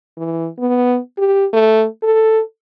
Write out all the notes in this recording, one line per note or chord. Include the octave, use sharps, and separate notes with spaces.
E3
B3
G4
A3
A4